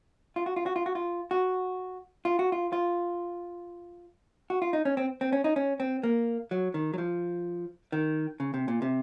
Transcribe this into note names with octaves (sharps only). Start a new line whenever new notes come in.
F4
F#4
F4
F#4
F4
F#4
F4
F#4
F4
F#4
F4
F4
F#4
F4
D#4
C#4
C4
C4
C#4
D#4
C#4
C4
A#3
F#3
D#3
F#3
F3
D#3
C#3
C3
A#2
C3